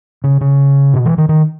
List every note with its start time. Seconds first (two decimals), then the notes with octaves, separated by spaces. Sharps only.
0.24 C#3
0.41 C#3
0.94 B2
1.05 E3
1.18 D#3
1.29 D#3